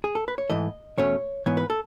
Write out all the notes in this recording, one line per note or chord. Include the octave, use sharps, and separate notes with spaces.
G#4
A4
B4
C#5
G#2 E3 A3 D#5
E2 B2 A3 C#4 C#5
G#2 E3 B3 C#5
B4
A4